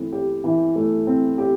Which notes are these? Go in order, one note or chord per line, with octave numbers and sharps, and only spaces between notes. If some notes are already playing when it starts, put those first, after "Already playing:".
Already playing: E3 A3 C4
G4
E3
A3
C4
G4